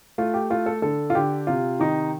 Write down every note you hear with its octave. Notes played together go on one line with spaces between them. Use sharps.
A3 F4
G4
A3 F4
A4
D3 A4
F4
D3 G4
C3 F4
D#3 D#4